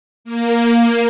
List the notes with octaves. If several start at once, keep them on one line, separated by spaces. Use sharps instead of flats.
A#3